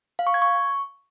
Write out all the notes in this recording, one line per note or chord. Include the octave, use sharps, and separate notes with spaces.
F5
C#6
G#6
C#6